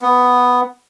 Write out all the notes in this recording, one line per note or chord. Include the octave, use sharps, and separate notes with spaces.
B3